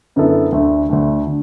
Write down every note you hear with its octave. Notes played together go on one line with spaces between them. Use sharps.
F#2 D3 B3 E4 A4
D2 D3 A3
D2 D3 A3
D3